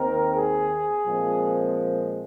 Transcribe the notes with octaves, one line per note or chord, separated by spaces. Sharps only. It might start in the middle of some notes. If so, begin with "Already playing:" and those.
Already playing: D#2 D#3 C4 A#4
G#4
A#2 F3 G#3 C4